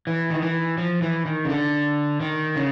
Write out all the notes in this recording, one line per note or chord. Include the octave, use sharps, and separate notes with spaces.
E3
D#3
E3
F3
E3
D#3
C#3
D3
D#3
C#3